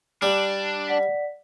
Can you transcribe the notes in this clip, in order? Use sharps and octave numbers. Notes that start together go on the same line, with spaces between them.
G3 D4
D5 F#5 B6